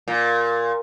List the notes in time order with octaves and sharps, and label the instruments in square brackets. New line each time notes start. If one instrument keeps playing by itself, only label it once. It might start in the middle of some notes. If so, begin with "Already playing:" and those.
[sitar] A#2